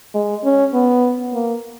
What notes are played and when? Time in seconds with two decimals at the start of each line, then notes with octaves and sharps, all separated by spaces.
0.15 G#3
0.44 C#4
0.74 B3
1.34 A#3